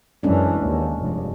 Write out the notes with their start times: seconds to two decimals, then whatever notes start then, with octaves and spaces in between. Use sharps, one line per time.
0.23 F#2 E3 G#3 C#4 D4
0.61 D#2
1.01 F1 G2